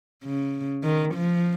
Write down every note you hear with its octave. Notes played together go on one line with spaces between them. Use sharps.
C#3
D#3
F3